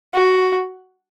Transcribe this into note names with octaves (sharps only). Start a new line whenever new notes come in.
F#4